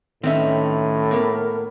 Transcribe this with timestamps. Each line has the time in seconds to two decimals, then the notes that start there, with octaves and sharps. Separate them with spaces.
0.23 A2 D#3 C4 C#4 D#4 B4 E5
1.11 A#3 B3 A#4